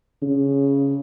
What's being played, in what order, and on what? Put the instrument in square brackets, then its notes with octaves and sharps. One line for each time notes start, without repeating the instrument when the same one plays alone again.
[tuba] C#3